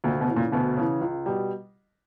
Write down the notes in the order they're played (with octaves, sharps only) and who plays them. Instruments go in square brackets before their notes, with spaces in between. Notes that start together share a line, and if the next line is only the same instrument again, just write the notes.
[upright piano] D2 [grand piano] A#2
[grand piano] B2
[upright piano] C#3 E3
[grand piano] A#2
[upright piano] D2 [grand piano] B2
[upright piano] C#3 E3
C#2
B2 G3